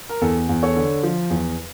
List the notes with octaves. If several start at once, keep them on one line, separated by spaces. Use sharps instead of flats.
A#4
E2 A4
E2
A4 C#5
D3
F3
E2